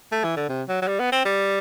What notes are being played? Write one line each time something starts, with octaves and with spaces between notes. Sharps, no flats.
A3
E3
D3
C3
F#3
F#3
G3
B3
C4
G3